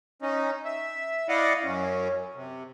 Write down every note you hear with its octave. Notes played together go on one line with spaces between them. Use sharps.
C#4 D#4
E5
E4 D5 D#5 F5 F#5
F#2 C#4
C3